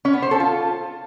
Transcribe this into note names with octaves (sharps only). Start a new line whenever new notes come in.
C#4
B3
C5
A4
F4